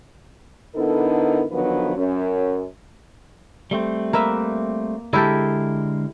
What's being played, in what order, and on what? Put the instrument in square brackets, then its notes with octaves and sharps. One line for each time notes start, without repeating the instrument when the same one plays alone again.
[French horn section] D3 B3 D#4 E4 A4 A#4
D3 D#3 F3 F#3 B3 B4
F#2 C#4
[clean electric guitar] G3 A3 C4
[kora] A#3 B4 E5
[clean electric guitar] D3 G#3 A#4 [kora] E4 G4 A4